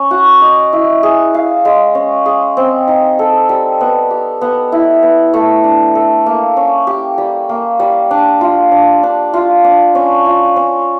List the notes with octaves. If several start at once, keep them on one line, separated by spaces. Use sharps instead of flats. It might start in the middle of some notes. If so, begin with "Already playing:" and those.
Already playing: C#4
F#4
D#5
E4
G#4
F5
G#3
C#4
G#4
C4
D#4
A4
G3
B3
G4
B3
E4
B3
A3
D4
A4
A#3
C#4
G4
G3
A#3
G3
D4
F4
D4
D4
F4
D4
C#4
F4
C#4